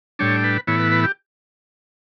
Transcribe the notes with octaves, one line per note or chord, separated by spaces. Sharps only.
A2 G3 D4 C#5
B4
A2 E3 B3 E4 C#5
B4
B4
G4